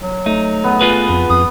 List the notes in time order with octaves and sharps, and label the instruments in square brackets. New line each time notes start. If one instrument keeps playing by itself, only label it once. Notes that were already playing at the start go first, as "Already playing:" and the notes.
[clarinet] F#3
[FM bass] A3 [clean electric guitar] D#4
[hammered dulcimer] B3
[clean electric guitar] F4 G#4 B4
[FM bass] F2
[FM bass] F2 [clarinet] D#6